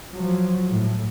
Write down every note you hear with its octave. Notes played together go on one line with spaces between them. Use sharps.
F3 F#3
A2